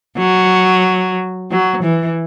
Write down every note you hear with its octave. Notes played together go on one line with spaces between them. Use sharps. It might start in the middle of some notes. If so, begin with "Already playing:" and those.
F#3
F#3
E3